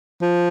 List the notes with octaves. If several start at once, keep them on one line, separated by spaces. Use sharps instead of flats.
F3